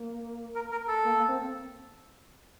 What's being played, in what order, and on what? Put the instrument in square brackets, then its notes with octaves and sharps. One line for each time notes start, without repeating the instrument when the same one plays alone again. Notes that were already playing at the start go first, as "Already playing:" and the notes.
Already playing: [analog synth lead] A#3
[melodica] A#4
A#4
A4
[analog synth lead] A#3
A#3
C4